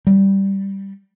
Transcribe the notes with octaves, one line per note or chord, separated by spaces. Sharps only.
G3